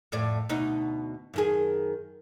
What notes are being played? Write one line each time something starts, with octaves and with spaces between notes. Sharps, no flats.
F2 A2 D5
D2 B2 D#4
F#2 D#3 G#4